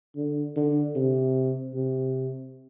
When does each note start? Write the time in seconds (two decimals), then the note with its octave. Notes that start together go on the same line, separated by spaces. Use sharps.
0.17 D3
0.56 D3
0.96 C3
1.74 C3